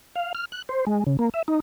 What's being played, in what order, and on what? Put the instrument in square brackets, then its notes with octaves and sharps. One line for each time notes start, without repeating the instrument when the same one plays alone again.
[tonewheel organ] F5
F6
F#6
C5
G#3
C#3
A#3
E5
D#4